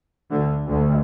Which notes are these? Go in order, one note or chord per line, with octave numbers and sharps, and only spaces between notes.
D2 D3
D2 D3